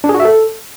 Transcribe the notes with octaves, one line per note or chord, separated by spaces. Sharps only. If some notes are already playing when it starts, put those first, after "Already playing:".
D4
G#4
F#4
E5
A4